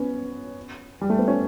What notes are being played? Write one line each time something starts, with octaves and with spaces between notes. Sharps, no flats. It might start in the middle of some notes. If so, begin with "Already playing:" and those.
Already playing: B3 C#4
G3
A3
B3
C#4